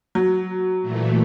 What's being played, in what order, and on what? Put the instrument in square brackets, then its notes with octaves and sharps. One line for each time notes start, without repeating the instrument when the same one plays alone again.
[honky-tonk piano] F#3
[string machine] A#2 E3 A3